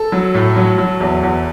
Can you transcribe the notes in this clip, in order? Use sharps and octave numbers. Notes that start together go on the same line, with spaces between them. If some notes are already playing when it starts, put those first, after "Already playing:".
Already playing: A4
F#3
A2
F#3
F#3
E2
E2